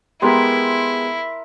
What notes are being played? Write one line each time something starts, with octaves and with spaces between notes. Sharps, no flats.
G#3 B3 E4 G4 A#4 C6